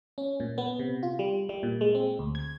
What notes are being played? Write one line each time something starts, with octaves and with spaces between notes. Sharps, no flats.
C#4
A#2
B3
C3
F4
G3
G3
A#2
G#3
C4
D2
G#6